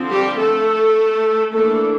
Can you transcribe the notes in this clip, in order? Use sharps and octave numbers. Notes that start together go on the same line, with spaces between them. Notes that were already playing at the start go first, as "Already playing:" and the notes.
Already playing: D3 F3 C4
G3 G4
A3 A4
E3 A3 A#3 D4 A4